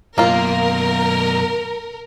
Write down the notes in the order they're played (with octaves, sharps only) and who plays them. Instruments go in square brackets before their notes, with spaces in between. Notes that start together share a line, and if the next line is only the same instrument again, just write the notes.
[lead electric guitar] F#2 B2 [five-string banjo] A#3 F4 [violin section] A#4